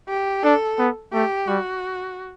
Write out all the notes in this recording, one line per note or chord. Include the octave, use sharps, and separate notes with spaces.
G4
D4 A4
B3
A3 G4
G3 F#4